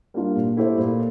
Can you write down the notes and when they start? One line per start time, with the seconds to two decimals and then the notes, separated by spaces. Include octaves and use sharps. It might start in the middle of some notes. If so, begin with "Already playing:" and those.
0.14 G3 A#3 D4 F4
0.35 A#2
0.57 A3 E4 G4 C5
0.77 A#2